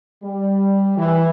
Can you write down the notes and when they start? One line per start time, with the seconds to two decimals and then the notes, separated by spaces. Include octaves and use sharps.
0.23 G3
0.97 E3